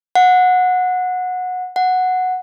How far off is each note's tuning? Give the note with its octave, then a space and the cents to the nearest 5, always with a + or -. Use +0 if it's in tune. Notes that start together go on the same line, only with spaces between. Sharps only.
F#5 -20
F#5 -5